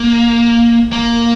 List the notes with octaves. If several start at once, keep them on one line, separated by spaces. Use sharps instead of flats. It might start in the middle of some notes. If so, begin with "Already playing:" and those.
Already playing: A#3
A#3